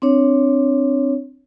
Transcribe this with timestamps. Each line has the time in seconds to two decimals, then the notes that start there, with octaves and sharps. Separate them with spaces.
0.02 C4 D4 C#5